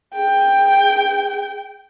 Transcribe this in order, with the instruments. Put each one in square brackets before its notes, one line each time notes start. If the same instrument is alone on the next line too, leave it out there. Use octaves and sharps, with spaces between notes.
[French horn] G#4 [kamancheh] G5